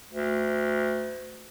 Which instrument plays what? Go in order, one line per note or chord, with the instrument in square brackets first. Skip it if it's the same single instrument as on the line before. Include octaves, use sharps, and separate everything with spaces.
[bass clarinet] D2